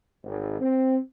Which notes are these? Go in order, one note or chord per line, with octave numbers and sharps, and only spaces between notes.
G#1
C4